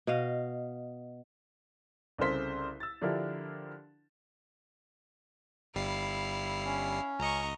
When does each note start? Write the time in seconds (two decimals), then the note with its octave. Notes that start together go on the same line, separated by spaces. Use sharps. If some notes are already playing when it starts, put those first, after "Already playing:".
0.07 B2 D#5 F5
2.18 C2 C#3 A4 A#4 C5 B6
2.80 E6 A6
3.01 D3 F3 D4 E4 G4 A#4
5.75 G1 G3 E4 F5 C7
6.65 C#4
7.19 C#2 D#5 A#5 C#6